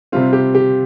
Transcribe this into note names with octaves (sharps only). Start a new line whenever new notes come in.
C3 G3 C4 F4
G4
G4